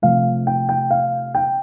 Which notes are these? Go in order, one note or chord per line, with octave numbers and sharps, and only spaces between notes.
C3 F3 A3 F5
G5
G5
F5
G5